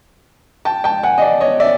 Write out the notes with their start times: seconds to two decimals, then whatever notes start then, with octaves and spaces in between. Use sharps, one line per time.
0.65 G5 A5
0.84 G5 A5
1.03 F#5 G#5
1.18 D#5
1.21 D5
1.41 C#5 D#5
1.60 D5 E5